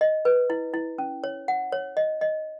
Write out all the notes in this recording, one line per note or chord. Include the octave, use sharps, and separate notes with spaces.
D#5
B4
E4
E4
C#4
C#5
F#5
C#5
D#5
D#5